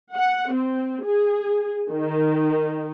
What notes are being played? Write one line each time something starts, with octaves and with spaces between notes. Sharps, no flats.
F#5
C4
G#4
D#3